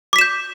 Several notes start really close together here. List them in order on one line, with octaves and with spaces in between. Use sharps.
D6 B6 E7 G6